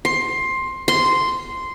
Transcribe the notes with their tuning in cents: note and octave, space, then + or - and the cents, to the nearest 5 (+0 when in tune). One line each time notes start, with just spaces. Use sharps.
C6 +15
C6 -5